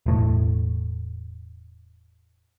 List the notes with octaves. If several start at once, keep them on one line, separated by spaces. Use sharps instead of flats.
E1 A2